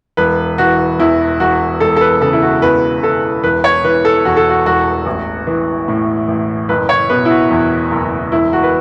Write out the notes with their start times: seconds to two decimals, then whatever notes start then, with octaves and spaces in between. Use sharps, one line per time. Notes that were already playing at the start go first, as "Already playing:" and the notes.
0.17 E1 B4
0.58 E3 F#4
0.99 E2 E4
1.40 E1 F#4
1.80 E1 A4
1.96 A4
2.01 B4
2.21 C#3 A4
2.33 E4
2.42 F#4
2.62 E2 B4
3.03 E3 A4
3.43 E1 B4
3.64 C#5
3.84 E3 B4
4.05 A4
4.25 E2 F#4
4.37 A4
4.49 F#4
4.66 E1 F#4
5.06 A1
5.47 E3
5.88 A2
6.28 A1
6.69 F#1 B4
6.89 C#5
7.10 B2 B4
7.25 E4
7.30 F#4
7.50 E2
7.91 F#1
8.32 E1 E4
8.53 F#4
8.63 B4